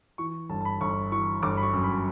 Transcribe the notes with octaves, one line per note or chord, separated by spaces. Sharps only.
E3 C#6
G1 A5
A5
B5
G1 C#6
E3 C#6
G1 D6
B5
C#6
F#2
B5